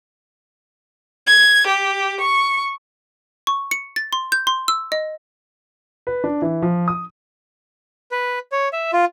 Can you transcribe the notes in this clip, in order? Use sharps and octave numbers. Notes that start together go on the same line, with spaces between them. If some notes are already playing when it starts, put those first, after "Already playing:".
G#6
G4
C#6
C#6
C#7
A6
C6
G6
C6
E6
D#5
B4
D4
E3
F3
D#6
B4
C#5
E5
F4